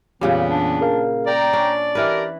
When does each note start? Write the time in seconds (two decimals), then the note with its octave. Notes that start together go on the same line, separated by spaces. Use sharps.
0.21 F2 A#2 C#3 E3 G3 B3
0.49 D4
0.81 G#4 A#4 F5
1.27 D5 G5 A#5
1.53 C#4 D4 A5
1.95 E3 E4 G4 A#4 B4